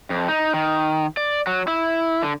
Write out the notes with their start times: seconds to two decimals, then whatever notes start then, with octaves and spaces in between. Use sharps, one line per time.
0.10 F2
0.28 D#4
0.54 D#3
1.17 D5
1.47 F#3
1.68 E4
2.23 D3